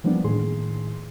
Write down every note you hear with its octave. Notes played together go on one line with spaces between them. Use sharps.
E3 F3 G3 A#3 B3 D4
A2 D#3 G#4 C6